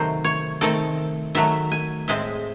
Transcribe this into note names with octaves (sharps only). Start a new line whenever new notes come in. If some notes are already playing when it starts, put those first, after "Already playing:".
Already playing: C3 D#3 F#3 A3 C4 C5
C#5
D#3 A3 C4 A4
D#3 F#3 A3 E5
G#5
A2 G#3 C4 E5